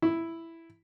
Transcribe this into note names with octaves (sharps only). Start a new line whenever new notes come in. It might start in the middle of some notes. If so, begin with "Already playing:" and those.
E4